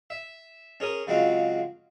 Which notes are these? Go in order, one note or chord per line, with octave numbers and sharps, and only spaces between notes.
E5
C#4 G#4 A#4 D#6
C#3 F#3 G#3 C4 F4 F#4